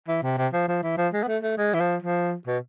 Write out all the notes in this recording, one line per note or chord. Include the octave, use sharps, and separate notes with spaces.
E3
C3
C3
F3
F3
E3
F3
G#3
B3
A3
A3
G#3
E3
F3
F3
B2